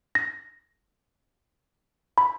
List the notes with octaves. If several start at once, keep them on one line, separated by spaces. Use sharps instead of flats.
A#6
B5